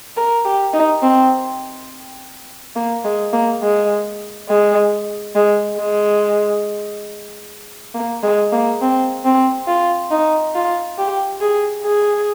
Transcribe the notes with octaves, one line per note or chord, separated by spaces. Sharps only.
A#4
G4
D#4
C4
A#3
G#3
A#3
G#3
G#3
G#3
G#3
A#3
G#3
A#3
C4
C4
F4
D#4
F4
G4
G#4
G#4